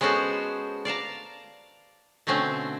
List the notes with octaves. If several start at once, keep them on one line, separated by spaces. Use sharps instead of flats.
G#3 B3 C#4 F#4 A4 C5
D5 F5 A5 A#5
B2 D3 A3 C4 C#4